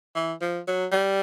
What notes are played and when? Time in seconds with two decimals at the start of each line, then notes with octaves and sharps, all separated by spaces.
0.15 E3
0.42 F3
0.67 F#3
0.92 G3